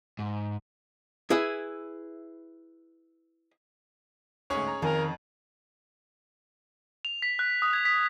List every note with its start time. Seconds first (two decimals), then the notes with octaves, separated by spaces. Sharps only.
0.19 G#2
1.30 E4 G#4 B4 E5
4.50 D2 G#2 C#4 G#4 C#5
4.67 A#5
4.82 F2 D#3 A#4 F5 G#5
7.05 F7
7.22 B6
7.39 F#6
7.62 D#6
7.73 G#6
7.85 B6